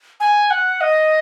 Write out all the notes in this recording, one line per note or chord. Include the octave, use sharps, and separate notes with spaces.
G#5
F#5
D#5